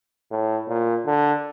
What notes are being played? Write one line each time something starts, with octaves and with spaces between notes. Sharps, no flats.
A2
A#2
D3